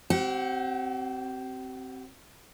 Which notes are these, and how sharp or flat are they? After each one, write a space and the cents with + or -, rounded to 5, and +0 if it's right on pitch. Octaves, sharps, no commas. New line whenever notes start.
C4 +0 G4 -40 F#5 +0